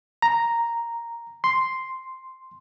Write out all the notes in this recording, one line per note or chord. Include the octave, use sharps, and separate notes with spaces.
A#5
C6